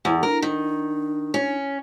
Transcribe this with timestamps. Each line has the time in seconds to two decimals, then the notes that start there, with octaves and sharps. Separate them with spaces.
0.05 E2
0.23 D4 A#4
0.42 D#3
1.34 C#4